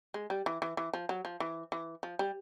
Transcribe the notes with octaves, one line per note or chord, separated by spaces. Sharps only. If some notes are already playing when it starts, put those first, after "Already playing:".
G#3
G3
E3
E3
E3
F3
F#3
F3
E3
E3
F3
G3